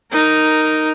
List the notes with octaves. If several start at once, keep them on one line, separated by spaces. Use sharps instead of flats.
D#4 A#4